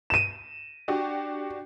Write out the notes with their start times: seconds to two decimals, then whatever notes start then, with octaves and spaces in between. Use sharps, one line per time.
0.10 D#7 E7
0.88 D4 F#4 G4